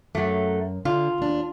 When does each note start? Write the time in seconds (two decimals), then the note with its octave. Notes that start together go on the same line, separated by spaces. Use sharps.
0.15 F#2 F#3 A3
0.85 D3 D4 F4
1.18 D#2 D4